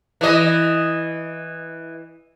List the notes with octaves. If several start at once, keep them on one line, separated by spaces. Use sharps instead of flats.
E3 D#5